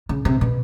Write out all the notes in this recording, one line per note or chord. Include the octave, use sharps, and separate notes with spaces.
C#3
C3
B2